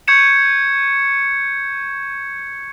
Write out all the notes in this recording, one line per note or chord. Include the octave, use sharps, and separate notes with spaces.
C#6 G6 G#6 C#7 E7